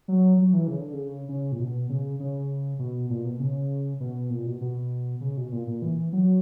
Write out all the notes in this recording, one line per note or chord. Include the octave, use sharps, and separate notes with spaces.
F#3
F#3
E3
C#3
D3
C#3
C#3
A#2
B2
C#3
C#3
B2
A#2
B2
C#3
B2
A#2
B2
B2
C#3
B2
A#2
A#2
E3
F#3